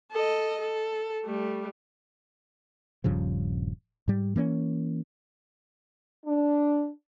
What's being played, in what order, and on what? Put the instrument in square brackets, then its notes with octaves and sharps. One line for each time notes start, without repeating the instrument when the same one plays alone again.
[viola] A4 D#5
A4
G3 A3
[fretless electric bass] D#1 G2 C#3 F3
G#2 G3
E3 A#3 B3 C#4
[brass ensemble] D4